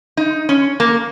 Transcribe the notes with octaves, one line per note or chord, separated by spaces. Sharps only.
D#4
C#4
A#3